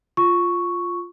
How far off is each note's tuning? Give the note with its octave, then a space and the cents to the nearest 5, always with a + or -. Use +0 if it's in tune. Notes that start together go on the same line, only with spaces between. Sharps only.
F4 +0 C#6 +0